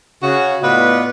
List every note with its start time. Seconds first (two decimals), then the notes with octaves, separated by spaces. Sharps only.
0.23 C#3 F#4
0.62 A2 B3 F4 B4 D5 D#5